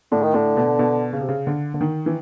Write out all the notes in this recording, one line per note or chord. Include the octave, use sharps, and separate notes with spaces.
A2 D3
D#3
A2 D3
B2
B2
C#3
C3
C#3
D3
D3
D#3
E3